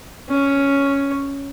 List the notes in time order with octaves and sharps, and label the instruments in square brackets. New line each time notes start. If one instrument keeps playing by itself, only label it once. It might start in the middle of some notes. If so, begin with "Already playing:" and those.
[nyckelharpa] C#4 C#5